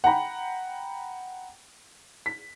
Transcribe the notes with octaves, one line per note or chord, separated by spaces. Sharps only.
F#5 G5 A#5 B5
B6